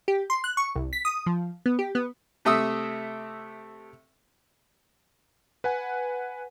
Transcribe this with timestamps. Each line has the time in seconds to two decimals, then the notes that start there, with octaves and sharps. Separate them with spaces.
0.08 G4
0.30 C6
0.44 F#6
0.57 C#6
0.75 C2
0.93 B6
1.05 D#6
1.26 F3
1.66 B3
1.79 G4
1.95 B3
2.45 C3 A3 E5 D#6 E6
5.64 B4 F#5 G#5